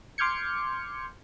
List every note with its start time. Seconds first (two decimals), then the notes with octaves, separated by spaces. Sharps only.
0.18 C6 D6 F6 G6 G#6 C#7